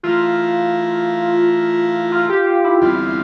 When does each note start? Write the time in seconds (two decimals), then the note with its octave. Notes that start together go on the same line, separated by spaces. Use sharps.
0.03 E3 A3 E4 F4 A#4
2.12 F4
2.29 G4
2.47 F4
2.64 E4
2.81 E2 D3 G3 C4 E4 F4